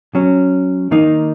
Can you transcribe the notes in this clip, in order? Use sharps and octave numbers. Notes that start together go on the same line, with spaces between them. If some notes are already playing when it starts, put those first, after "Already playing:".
F#3 C#4
D#3 A#3 D#4